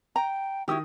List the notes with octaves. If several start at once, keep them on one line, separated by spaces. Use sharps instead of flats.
G5 A#5
D#3 E4 F#4 G4 D#6